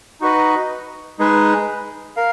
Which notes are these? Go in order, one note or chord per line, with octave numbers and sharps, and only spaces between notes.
D#4 F#4 B4 D#5
G#3 D#4 G#4 B4
A#4 F5